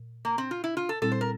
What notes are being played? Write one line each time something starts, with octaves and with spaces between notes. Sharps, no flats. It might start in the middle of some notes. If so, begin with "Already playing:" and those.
Already playing: A#2
A#3
C4
F4
E4
F4
A4
A#2 G3 C4 E4 A4
C5
A#4